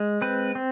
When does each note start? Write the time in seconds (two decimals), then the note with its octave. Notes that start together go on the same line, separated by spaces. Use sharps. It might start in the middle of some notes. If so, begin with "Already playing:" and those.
Already playing: G#3
0.22 C4 B4
0.55 C4